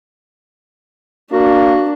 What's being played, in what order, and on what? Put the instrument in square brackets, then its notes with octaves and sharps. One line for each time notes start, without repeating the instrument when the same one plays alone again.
[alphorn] A#3 [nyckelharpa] D4 [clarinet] F#4